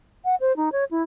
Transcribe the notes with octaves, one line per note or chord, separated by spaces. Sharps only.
F#5
C5
D#4
C#5
E4